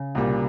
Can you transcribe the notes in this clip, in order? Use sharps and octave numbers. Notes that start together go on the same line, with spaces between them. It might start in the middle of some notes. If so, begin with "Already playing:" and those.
Already playing: C#3
C2 A#2 G3